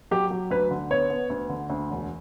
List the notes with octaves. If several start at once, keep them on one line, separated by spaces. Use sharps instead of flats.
F#3 G4
F#3
D2 B4
D3
B3 C#5
B3
D2
D3
D2
E1